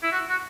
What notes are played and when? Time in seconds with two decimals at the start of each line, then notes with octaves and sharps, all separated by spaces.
0.03 E4
0.12 F#4
0.29 F#4